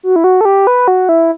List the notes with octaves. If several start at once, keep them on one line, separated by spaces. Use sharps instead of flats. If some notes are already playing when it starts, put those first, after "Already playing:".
F#4
E4
F#4
A4
G4
B4
F#4
E4